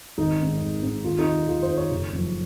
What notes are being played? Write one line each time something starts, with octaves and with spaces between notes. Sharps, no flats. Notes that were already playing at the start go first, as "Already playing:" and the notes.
G#1 D#4
G#2 D#3
G#1
G#2 D#3
D#2 F4
D#4
D#3
D#2 F4
C5
D#3
C#5
F#1
F#2 F3